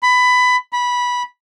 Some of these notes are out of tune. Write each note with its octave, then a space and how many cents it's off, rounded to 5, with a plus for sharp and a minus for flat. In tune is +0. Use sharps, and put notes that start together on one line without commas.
B5 +15
B5 -15